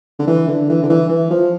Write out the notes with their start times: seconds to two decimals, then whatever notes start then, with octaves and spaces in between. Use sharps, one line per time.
0.19 D3
0.27 E3
0.48 D3
0.69 E3
0.83 D3
0.90 E3
1.09 E3
1.30 F3